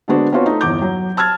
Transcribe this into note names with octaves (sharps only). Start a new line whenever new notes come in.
D3 G#3 B3 D4 F#4 C5
B3 C4 D4 F4 F#4 C#5
A3 D#4
G1 E2 D6 G6
F#3
A5 E6 F6 G#6 A6